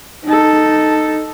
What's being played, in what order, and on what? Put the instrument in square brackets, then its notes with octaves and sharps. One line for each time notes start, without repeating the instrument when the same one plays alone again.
[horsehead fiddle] D#4 A4